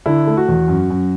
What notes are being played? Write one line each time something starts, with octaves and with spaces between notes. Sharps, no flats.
D3 E4
A3
F#4
E2
F#2
F#2